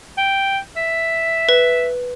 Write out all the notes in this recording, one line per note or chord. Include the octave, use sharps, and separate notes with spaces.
G5
E5
B4